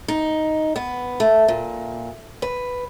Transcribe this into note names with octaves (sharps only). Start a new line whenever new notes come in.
D#4
B3
A3
A#2
B4